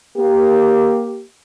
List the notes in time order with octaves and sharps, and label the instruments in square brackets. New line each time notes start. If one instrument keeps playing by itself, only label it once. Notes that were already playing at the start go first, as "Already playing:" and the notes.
[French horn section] A#3 G4